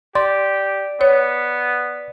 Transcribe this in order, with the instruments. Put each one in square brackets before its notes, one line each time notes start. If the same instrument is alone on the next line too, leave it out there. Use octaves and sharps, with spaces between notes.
[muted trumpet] G4 [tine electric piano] D5 [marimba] C6
[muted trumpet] B3 [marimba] C#5